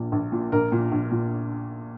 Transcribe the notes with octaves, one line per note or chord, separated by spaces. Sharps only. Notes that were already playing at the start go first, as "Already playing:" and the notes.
Already playing: A#1 A#2
A#1
A#2
A#1 A#4
A#2
A#1
A#2